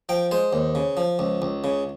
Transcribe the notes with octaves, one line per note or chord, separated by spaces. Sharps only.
F3 G5
G#3 C5
D#2
C#3
F3
C#2
C#2
C#3